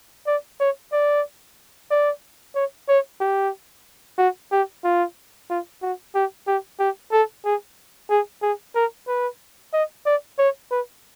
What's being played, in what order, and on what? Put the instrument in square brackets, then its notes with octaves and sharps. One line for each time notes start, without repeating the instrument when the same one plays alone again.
[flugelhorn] D5
C#5
D5
D5
C#5
C#5
G4
F#4
G4
F4
F4
F#4
G4
G4
G4
A4
G#4
G#4
G#4
A#4
B4
D#5
D5
C#5
B4